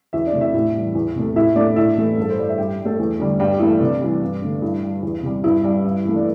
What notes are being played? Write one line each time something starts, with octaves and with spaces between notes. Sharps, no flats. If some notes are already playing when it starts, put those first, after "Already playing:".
E2 E4 E5
D4 D5
C3 A3
E4 E5
A2 E4 E5
E3 G3
E2
C3 A3
A2 E4 E5
A3 D4 D5
A2 E4 E5
E3 A3
G2 A4
C5
G3 D5
E5
G2 G4 G5
G3
A3 A4
E2
D3 G3
G2 G3 G4
E3 A3 E4
C3 D4
E3 G3
G2
D3 A3
G2 E4
G3
E2
C3 G3
G2 E4
G3
G2
E3 A3
D4